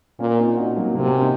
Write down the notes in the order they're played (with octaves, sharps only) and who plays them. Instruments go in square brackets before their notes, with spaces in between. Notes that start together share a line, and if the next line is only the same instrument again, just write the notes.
[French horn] A#2 [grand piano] A#3 C#4
[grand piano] C4 D#4
D#4 F#4
F#3 A#3
[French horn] C3 [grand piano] F#3 A#3
[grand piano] A#3 C#4
C4 D#4